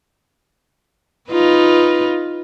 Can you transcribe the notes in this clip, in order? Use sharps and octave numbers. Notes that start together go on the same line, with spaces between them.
D#4 F4 B4